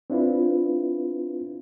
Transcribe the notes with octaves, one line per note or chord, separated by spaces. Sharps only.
C4 D4 E4 F4 B4